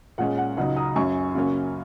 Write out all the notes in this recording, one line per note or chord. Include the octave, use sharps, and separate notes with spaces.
A#2 G#3 C#4 F#5
F#5
C#2 C#3 F#3 D#4 F#5
A#5 D#6
F#2 F#3 C#4 G#5 C#6
C#3 F#3 A#3 C#4